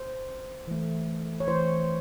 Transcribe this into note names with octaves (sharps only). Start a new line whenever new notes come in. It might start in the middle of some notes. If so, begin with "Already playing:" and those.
Already playing: C5
E3 A3
C#5
E3 A3 C5